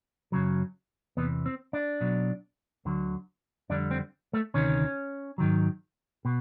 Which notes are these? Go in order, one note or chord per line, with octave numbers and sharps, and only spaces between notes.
F#2 C#3 F#3
E2 C3 E3 B3
C4
D4
B1 B2 F#3
D2 D3 F#3
F2 D3 G3 D4
C4
A3
D2 C3 D#3 C#4
G#2 D#3 F#3
B2